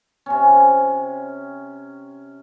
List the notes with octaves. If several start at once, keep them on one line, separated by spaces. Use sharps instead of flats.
C3 C#4